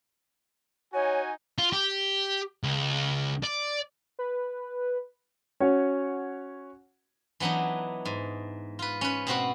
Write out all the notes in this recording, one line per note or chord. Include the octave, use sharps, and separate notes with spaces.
D#4 F#4 C#5 G#5
F4
G4
C#2
D5
B4
C#4 F#4 C#5 F#5
E3 F#3 B3 D4 D#4
G#2
F4 B4
C#4 B4
B2 C4 F#4 B4